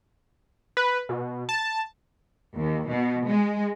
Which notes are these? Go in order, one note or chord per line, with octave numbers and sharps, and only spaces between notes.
B4
B2
A5
D#2
B2
G#3